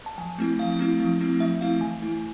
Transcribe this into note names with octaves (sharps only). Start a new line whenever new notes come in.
A5
F3 G#5
A3 C4 E4
F3 F5
A3 C4 E4
F3
A3 C4 E4
F3 E5
A3 C4 E4 F5
E3 G#5
A3 E4